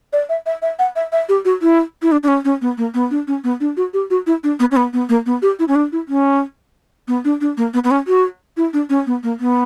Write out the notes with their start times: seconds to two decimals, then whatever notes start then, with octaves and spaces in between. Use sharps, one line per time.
0.13 D5
0.29 E5
0.46 E5
0.62 E5
0.79 F#5
0.96 E5
1.12 E5
1.29 G4
1.45 F#4
1.62 E4
2.02 E4
2.12 D4
2.23 D4
2.28 C#4
2.45 C#4
2.61 B3
2.78 A#3
2.94 B3
3.11 D4
3.27 C#4
3.44 B3
3.60 D4
3.77 F#4
3.94 G4
4.10 F#4
4.27 E4
4.44 D4
4.60 B3
4.71 C#4
4.76 B3
4.93 B3
5.09 A#3
5.26 B3
5.42 G4
5.59 E4
5.68 C#4
5.75 D4
5.92 E4
6.08 C#4
7.08 B3
7.25 D4
7.41 D4
7.57 A#3
7.74 B3
7.84 B3
7.91 C#4
8.07 F#4
8.57 E4
8.73 D4
8.90 C#4
9.07 B3
9.23 A#3
9.40 B3